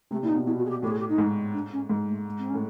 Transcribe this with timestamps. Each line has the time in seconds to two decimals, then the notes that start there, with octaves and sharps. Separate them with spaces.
0.11 C3 A3
0.23 A#2 E4
0.28 D#4
0.35 B2
0.46 B2 E4
0.58 F#4
0.65 G#4
0.70 G4
0.83 A2 G4
0.91 G#4
1.00 G4
1.09 D#4
1.18 G#2
1.53 D4
1.72 C#4
1.89 G#2 G#3
2.08 A3
2.25 A3
2.38 C4
2.49 C#4
2.54 A2